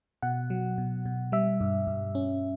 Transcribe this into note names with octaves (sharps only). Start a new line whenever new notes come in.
B2 F#5
F#3
B2
B2
G3 E5
G2
G2
C#4